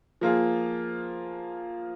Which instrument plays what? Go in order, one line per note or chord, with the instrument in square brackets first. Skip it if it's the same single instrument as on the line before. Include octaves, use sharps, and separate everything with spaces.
[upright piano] F3 A#3 F4 G#4